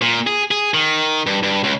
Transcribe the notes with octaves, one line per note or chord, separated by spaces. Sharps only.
A#2
G#4
G#4
D#3
G2
G2
C#2